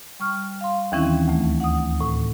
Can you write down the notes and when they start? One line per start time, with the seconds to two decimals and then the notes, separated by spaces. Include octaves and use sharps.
0.20 G3 C#6 F6
0.61 F5 C6
0.92 D#2 D#3 E3 C4 C#4 E4
1.28 D2 A3
1.60 F#5 D#6
2.01 A2